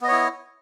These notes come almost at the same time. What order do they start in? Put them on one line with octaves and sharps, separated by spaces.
B3 D#5 C#5 E4